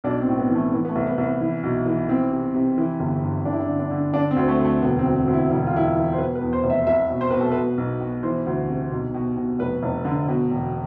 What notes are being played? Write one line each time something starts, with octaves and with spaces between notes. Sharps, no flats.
B1 D4
C4
A2
B3
E3
A3
E3 B3
B3
A3
C2
B3
C2
B3
E3
B1
E3
E3 C4
C3
C3
E3
G1
G2
G2 D4
E4
D4
D3
D4
D3
D3 D4
C4
D2
A3
D2 A3
E1 B3
C4
D2
C4
D2
E4
E1 E4
F4
E1 E4
F4
E3
C5
B2 B4
B4
E2
C5
F1
E5
C2 E5
B2
C5
B2 B4
A4
B2 B4
B1
B2
E3 C5
D2
C3
B1
B2
B2
F1 B4
F1
D3
B2
E1